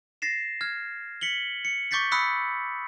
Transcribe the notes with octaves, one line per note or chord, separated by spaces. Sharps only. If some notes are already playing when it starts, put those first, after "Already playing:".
A6 A#6 C7 E7
F6 G#6
B6 C#7 F#7 G7
C#7
C#6 D6 G6 A6 B6 C#7
B5 D#6 E6 F#6 B6 C#7